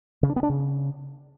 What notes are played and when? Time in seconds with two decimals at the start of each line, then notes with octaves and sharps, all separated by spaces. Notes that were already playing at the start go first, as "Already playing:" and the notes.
0.23 C#3
0.30 D4
0.36 B3
0.43 D4
0.50 C#3